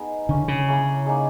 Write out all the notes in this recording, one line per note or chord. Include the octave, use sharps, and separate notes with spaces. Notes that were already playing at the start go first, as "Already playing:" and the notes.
Already playing: B3 D#4 G#4
D3 A#3 C#4 E4 G#4
C#3
A#3 C#4 E4 G#4
A#3 D#4 G#4